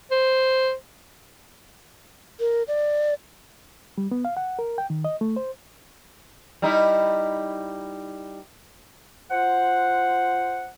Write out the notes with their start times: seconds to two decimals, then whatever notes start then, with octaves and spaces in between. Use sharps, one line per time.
0.11 C5
2.40 A#4
2.68 D5
3.98 G3
4.11 B3
4.25 F5
4.37 F#5
4.59 A#4
4.78 G5
4.90 D#3
5.05 D#5
5.21 A3
5.36 C5
6.62 G3 D#4 E4
9.31 F4 C5 F#5